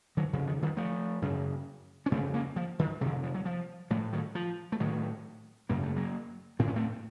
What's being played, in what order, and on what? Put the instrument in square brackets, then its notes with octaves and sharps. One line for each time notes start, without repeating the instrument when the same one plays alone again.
[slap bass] D#3 F#3
F2 C#3
D#3
D#3 F#3
F3 A3
F#2 C#3
C#4
F2 C#3 A3 C4
A#3 C#4
F3
D#3
C3 D#3
F2
F3
F#3
F3
A2 F3 A3
D#3 F#3
F3
A3
A2 D#3 F#3
F#2 C#3 A#3
A3
F#3 A#3
A2 C4
C#4
A3 C4